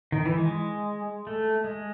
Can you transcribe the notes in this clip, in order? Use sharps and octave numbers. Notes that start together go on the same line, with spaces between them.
D#3
E3
G#3
A3
G#3